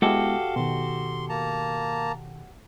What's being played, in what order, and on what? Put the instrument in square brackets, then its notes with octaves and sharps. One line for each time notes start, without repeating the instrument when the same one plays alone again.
[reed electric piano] G#3 B3 E4 [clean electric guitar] F#4 G4 A4 [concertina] F5
[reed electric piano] B2 D#3 [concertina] C6
[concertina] A#3 A5 A#5